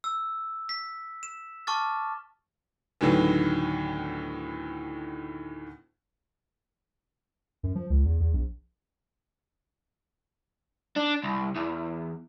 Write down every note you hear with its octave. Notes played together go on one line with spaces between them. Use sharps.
E6
B6
E7
A5 C#6 D6 F6 A6
D2 A2 D3 D#3 F#3 B3
F#2
F3
C#2
E2
E2
A#1
D4
C2
E2